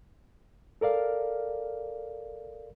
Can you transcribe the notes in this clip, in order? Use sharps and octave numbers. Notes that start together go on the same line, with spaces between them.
A4 A#4 D5 F5